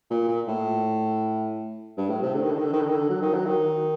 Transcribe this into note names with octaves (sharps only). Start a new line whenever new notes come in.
A#2
A#2
A2
G2
A2
C3
D3
D#3
D3
D#3
D3
D#3
D3
D#3
D3
F#3
D#3
F#3
D#3